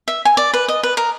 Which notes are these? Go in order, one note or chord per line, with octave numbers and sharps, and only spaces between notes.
E5
G#5
D5
B4
D#5
B4
A#4